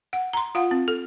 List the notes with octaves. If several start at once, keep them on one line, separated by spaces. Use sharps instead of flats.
F#5
A#5 C6
F4 F5 F#5
C4
A4